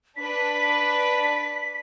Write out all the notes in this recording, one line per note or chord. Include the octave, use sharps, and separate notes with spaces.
D4 B4 B6